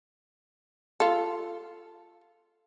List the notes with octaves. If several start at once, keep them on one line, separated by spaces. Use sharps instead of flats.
F4 A4